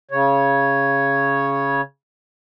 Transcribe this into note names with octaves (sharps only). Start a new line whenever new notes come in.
C#3 C#5